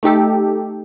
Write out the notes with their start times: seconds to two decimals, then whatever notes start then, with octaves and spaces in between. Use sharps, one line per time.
0.03 A3 D#4 G4 A4